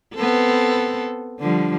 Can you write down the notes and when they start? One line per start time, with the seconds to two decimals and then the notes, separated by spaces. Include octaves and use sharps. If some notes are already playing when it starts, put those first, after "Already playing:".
0.14 B3 C4 A4
1.40 D3 F3 G3